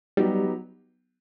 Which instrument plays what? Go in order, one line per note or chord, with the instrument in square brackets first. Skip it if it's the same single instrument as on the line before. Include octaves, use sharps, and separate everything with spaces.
[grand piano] F#3 B3 D#4 G4 [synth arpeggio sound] G3